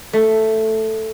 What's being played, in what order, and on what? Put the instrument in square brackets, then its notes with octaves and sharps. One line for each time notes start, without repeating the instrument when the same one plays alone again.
[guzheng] A3